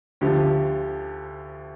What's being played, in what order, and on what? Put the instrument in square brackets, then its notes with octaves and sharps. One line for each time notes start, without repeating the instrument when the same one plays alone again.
[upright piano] D2 D3 F3 G4